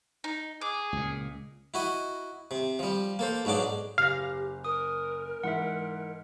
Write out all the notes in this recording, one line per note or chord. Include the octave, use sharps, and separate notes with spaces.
D#4
G#4 D6
C#2 A#2
E4 F#4 D#5
C3
F3 G3
A#3 A4 C5
B1 G#2 F#3 D4 D6
F#1 G4 F5 A#6
A#4 D#6
G#2 E3 E5 F#5